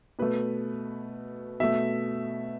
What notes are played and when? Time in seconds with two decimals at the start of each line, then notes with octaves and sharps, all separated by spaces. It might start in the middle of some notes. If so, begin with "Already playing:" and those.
0.19 B2 A3 B4
1.60 B2 A3 E5